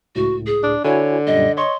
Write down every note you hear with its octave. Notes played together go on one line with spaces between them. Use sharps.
C#2 A2 F#4
G#4
D4
D3 E4 F#4 C#5 G#5
F#2 A#2 G3 D#5
C#5 D#5 C6 C#6